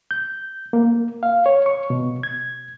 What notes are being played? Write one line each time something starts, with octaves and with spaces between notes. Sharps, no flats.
G6
A#3
F5
C#5
C#6
B2
G#6